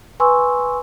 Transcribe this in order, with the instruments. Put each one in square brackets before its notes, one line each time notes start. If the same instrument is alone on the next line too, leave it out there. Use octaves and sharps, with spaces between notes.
[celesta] B4 G#5 C6 C#6 E6